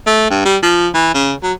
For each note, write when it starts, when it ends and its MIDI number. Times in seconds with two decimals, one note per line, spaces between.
0.07 0.28 57
0.31 0.43 43
0.45 0.57 55
0.63 0.88 53
0.94 1.13 52
1.14 1.33 49
1.43 1.53 54